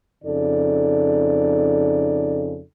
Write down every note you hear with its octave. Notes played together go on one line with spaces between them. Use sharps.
F2 C#3 D#4 A4 D5